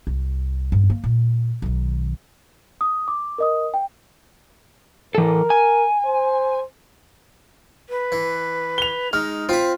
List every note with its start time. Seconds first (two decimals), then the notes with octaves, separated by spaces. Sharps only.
0.07 C2
0.72 G2
0.90 A#3
1.04 A#2
1.62 B1 D#3
2.81 D#6
3.08 D6
3.38 A#4 D#5 D#6
3.74 G5
5.15 E3 A4 A#4
5.50 G#5
6.06 C5
7.89 B4
8.12 E3
8.78 F7 G7
9.13 G#3 D#4 F6
9.49 C4 F4 B5